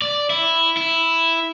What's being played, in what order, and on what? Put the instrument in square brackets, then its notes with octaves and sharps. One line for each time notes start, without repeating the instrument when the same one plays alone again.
[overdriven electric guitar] D5
E4
E4